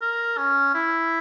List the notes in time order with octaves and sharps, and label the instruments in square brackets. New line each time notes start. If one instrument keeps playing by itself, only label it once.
[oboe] A#4
C#4
E4